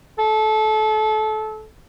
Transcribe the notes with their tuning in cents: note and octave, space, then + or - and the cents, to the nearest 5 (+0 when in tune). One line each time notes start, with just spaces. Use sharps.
A4 -25